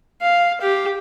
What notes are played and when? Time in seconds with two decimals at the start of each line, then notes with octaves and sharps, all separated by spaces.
0.21 F5
0.61 G4